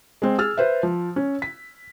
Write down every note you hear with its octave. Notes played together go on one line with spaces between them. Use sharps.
G#3 C4
G#4 E6 F6 A6
B4 C5 E5
F3
C#4
B6